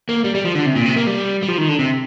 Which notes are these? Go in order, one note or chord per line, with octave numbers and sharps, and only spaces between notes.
A#3
G3
G3
F3
D3
C3
A#2
C3
A#3
G3
G3
F3
D#3
D3
C3